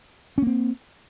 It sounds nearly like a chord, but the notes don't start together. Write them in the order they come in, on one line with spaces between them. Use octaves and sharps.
C#4 A#3 C4